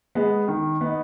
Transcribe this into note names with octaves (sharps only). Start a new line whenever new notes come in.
G#3 B3
D#3
B3 D#4